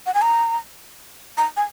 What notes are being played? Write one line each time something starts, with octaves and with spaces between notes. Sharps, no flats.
F#5
G#5
A#5
A#5
G#5